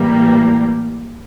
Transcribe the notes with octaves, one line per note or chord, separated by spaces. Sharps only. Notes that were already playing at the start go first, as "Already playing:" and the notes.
Already playing: A2 E3 G3 A#3